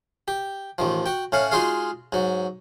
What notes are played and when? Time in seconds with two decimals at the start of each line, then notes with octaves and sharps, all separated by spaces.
0.28 G4
0.78 A1 D#3 F3
1.06 F#4 G5
1.32 A2 C#4 F5 F#5
1.51 G#3 D#4 F4 F#4 G#4 F5
2.12 G#2 F#3